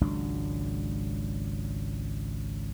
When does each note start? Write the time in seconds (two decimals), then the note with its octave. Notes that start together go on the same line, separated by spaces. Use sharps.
0.01 G#1 C#2 F#3 D4